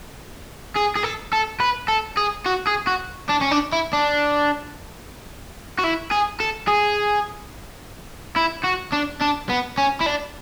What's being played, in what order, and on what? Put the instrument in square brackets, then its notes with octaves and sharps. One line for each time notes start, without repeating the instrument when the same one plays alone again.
[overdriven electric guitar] G#4
G#4
A4
A4
B4
A4
G#4
F#4
G#4
F#4
D4
C#4
D4
E4
D4
F#4
E4
G#4
A4
G#4
E4
F#4
D4
D4
B3
C#4
E4
D4